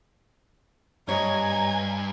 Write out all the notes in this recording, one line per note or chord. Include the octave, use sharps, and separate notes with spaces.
G2 C#5 D#5 G#5 A#5 G#6